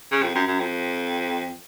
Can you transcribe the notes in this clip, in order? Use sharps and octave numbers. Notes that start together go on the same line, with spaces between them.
C#3
F2
F#2
F#2
F2